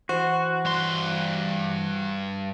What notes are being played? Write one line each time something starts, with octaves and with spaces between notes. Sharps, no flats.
E3 F#4 C5
G2 C6